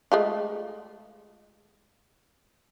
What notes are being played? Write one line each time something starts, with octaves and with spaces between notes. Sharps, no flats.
G#3 A3 F4